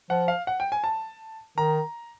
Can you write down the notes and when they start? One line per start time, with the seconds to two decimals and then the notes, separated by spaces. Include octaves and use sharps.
0.10 F3 F#5
0.28 F5
0.47 F#5
0.60 G5
0.72 G#5
0.84 A5
1.58 D#3 A#5